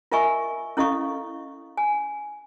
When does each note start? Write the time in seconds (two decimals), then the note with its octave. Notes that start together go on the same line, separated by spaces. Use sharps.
0.12 F4 A#4 D#5 E5 G#5 C#6
0.77 C#4 E4 A4 D#5 F5 C#6
1.77 G#5